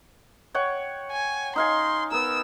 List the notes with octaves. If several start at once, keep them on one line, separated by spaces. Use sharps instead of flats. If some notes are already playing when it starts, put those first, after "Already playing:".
C#5 F#5 G5
G#5
D#4 F5 G#5 C6
B3 A#4 E6